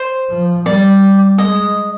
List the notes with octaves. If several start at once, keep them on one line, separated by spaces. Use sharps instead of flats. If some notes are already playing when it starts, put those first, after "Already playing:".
Already playing: C5
F3
G3 D5
G#3 D#5